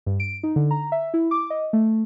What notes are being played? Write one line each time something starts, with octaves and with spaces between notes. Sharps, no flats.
G2
D7
D#4
D3
A#5
E5
E4
D6
D#5
A3